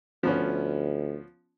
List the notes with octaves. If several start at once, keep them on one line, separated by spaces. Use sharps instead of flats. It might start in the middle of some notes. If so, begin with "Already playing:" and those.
D2 F3 B3 C#4